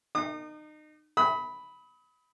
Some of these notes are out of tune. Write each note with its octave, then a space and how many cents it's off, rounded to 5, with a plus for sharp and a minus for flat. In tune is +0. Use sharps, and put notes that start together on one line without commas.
D#4 -30 D#6 -45
B5 +0 D#6 +40